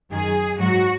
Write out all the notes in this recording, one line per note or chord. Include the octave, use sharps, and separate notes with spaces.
F#2 D#3 F#3 G#4
G#2 F#3 F#4